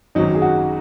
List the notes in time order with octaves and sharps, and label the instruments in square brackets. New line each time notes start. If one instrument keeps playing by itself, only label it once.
[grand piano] G#1 F#2 D#3 F#3 C#4 [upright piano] D#4
[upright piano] G#4
F#4